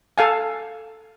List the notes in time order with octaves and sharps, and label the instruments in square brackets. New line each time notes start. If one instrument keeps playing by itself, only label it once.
[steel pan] A4 F5 G#5